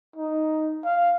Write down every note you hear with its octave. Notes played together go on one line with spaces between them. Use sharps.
D#4
F5